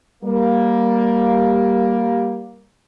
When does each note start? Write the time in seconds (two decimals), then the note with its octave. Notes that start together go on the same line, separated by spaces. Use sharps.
0.23 G3 A#3